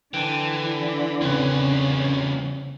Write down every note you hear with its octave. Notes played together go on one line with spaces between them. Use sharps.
D3 E3 G5 A5
E2 C#3 C4 C#4 B4